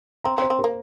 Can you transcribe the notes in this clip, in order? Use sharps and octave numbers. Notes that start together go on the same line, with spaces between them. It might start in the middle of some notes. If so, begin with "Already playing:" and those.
C4 A#5
C4
C5
C4
A#4
A#3